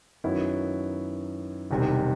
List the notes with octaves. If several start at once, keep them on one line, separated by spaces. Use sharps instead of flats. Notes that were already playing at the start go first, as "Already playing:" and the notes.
F#2 D#3 F#3 B3 E4
E1 E2 C3 D#3 G3